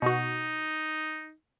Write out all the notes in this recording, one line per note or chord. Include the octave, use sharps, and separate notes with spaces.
B2 D#4 F#4